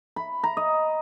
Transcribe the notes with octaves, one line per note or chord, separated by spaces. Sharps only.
B5
A#5
D#5